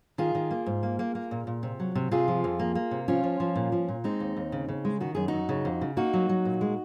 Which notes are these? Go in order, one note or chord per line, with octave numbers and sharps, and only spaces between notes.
D#3 F4 G#4
D#3
A#3
G#2
A#3
A#3
A#3
A#2
A#2
C3
F#3
C3
C3 F4 G#4
F3
F2
A#3
A#3
C3
F3 C#4 F4
F3
F3
A#2
F3
A#2
G#3 C4 D#4
D#2
D#2
C#3
C#3
G#3
D#3 F#4
F#2 G#4
F#2 D#4 F#4
C#3
F2
C#3
A#3 D#4 F#4
F#3
F#3
A#2
G#3